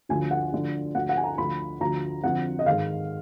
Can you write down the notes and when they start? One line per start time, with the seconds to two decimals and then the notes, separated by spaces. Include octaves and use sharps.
0.09 D2 D3 F3 G#5
0.31 F#5
0.52 D2 D3 F3
0.95 D2 D3 F3 F#5
1.09 F#5
1.17 G#5
1.24 A#5
1.38 D2 D3 F3 B5
1.80 D2 D3 F3 A#5
2.23 F2 D3 F3 F#5
2.59 D#5
2.66 G#2 D#3 F5